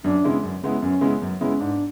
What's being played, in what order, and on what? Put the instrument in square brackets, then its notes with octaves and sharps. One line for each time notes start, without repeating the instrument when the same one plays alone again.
[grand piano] F#2 [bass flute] D4
[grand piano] C#3 G#3 B3 E4
F#2
C#3 G#3 B3 E4
[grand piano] F#2 [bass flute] C#4
[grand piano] C#3 G#3 B3 E4
F#2
C#3 G#3 B3 E4
[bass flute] C#4
[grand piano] G#2 [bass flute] D4